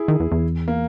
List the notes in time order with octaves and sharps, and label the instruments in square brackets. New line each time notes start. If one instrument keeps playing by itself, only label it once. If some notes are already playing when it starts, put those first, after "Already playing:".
Already playing: [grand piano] E4 G#4
[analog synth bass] D#3
E2
E2
[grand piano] A#3